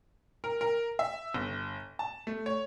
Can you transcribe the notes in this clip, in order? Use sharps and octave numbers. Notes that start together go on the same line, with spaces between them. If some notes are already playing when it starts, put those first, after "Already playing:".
A#4
A#4
E5
G1
A5
A3
C#5